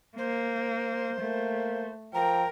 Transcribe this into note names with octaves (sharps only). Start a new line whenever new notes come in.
A#3 C5
A3 A#3
F3 A#4 G5 A#5